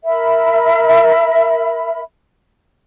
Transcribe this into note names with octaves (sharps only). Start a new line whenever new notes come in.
A#4 E5 B5